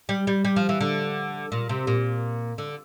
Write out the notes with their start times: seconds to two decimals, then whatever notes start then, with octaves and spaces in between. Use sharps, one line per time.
0.09 G3
0.27 G3
0.45 G3
0.56 F3
0.69 E3
0.81 D3
1.52 A#2
1.69 C3
1.87 A#2
2.58 D3